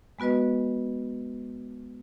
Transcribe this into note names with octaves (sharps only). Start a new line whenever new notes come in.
G#3 B3 F#4 B4 D#5